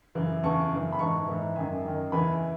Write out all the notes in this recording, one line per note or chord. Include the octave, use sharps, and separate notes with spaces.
F#2 C#3 E3
E2 C#3 E3 A5 C#6
F#2 C#3 E3
B5
G#2 E3 A5 C#6
G#2 E3
F#2 D#3 E5 G#5
F#2 D#3
E2 C#3 E3 G#5 B5